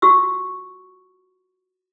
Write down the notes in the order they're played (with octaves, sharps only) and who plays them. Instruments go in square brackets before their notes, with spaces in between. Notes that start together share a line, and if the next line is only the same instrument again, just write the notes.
[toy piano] F4 F#4 C#6 E6